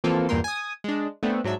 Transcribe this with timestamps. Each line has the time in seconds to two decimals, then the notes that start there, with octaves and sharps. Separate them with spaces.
0.04 E3 F3 A#3 C4 F4 A4
0.29 E2 G2 A#2 A#4 G5 C6
0.44 G#5 D#6
0.84 G#3 D4
1.23 A3 B3 C4 D4
1.44 G#2 F#3 D4 E5